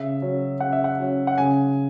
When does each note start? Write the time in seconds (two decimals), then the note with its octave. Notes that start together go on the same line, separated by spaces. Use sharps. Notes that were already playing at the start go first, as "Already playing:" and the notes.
Already playing: C#3 E5
0.22 F#3 C#4
0.60 C#3 F#5
0.73 E5
0.84 F#5
0.99 F#3 C#4
1.27 F#5
1.38 C#3 G#5